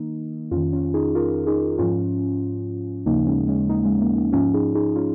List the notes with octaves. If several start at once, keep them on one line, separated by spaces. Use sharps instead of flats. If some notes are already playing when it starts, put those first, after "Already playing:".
Already playing: D#3 A#3 D#4
F2 C#4 F4
D#3
C#4 F4
D#4 G#4
F4 A#4
D#4 G#4
G#2 F3 C#4 F4
D#2 C#3 F3 A#3 D#4
G#3 C#4
G#3 C#4
A#3 D#4
G#3 C#4
A#3
A#3 D#4
G#2 F3 C#4 F4
D#4 G#4
D#4 G#4
C#4 F4